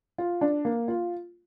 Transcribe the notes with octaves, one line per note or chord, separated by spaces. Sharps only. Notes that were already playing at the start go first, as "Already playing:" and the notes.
F4
D4
A#3
F4